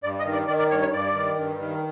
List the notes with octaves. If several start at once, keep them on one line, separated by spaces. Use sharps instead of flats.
G2 D5
D#5
D#3
D5
D#3 D5
D5
G2 C#5
C#5
G2 D5
D#3
G2
D#3